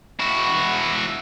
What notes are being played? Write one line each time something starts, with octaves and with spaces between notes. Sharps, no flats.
E4 F#4